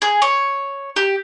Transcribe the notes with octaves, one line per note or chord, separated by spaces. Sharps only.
G#4
C#5
G4